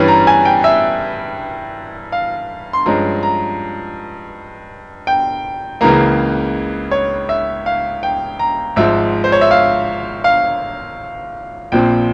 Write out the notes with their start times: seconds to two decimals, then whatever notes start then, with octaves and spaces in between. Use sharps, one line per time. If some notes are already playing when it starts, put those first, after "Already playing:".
Already playing: G2 E3 G3 C#4
0.08 A#5
0.27 G#5
0.45 G5
0.64 E5
2.12 F5
2.73 C6
2.86 G2 F3 G#3 C#4 A#5
3.23 A#5
5.07 G5
5.81 C#2 C#3 E3 A#3 A#5
6.91 C#5
7.29 E5
7.66 F5
8.03 G5
8.39 A#5
8.76 G#1 G#2 F3 E5
9.24 C5
9.32 C#5
9.41 E5
9.51 F5
10.24 F5
11.72 A#1 A#2 F3 C4 G5